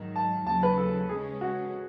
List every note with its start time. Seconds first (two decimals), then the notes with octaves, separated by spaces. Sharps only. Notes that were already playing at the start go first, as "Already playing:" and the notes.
Already playing: G#2 D#3 F#3
0.16 A5
0.46 D#2 C#3 F#3 C#4 A5
0.63 B4
0.78 A4
1.09 C#3 G#3 C#4 G#4
1.41 F#4